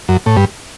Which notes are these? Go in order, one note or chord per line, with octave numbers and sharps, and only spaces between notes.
F#2
A2
G2